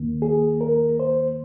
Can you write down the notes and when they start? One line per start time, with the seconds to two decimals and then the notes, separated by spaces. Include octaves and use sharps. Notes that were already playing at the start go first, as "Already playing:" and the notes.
Already playing: D#2 D#3 A#3
0.22 G#4
0.61 A#4
1.00 C5